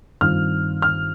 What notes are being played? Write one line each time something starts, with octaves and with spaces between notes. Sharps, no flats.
G2 D#3 C4 F4 F6
F6